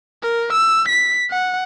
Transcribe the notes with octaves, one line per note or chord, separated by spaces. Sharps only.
A#4
E6
B6
F#5